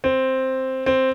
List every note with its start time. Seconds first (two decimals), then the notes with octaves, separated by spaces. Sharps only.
0.04 C4
0.86 C4